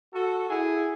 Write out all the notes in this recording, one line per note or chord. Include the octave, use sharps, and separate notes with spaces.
F#4 A4
E4 G#4